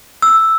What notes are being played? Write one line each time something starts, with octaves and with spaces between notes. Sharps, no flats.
E6